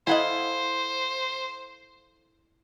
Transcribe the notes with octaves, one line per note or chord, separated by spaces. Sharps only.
E4 A4 C5 D#5 F5 F#5 G#5